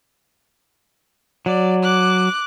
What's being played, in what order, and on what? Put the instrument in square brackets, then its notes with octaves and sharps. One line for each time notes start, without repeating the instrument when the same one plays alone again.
[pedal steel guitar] F#3 [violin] D5
[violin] D6 F#6